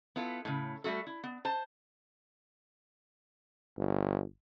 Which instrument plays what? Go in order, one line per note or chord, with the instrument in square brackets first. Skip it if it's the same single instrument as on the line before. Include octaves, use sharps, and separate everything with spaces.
[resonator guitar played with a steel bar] B3 E4 F4 A4
A2 C#3
G3 A3 F#4 A4
E4
B3
C5 A5
[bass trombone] G1